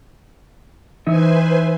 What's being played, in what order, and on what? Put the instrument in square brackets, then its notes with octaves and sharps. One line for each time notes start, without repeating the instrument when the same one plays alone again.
[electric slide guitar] E3 D#4 E5 [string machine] B4 C5 G#5